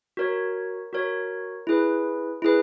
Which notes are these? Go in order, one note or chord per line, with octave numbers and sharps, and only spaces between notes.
F#4 A#4 C#5
F#4 A#4 C#5
E4 G#4 B4
E4 G#4 B4